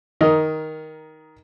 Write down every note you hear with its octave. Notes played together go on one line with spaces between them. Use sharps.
D#3 A#4 D#5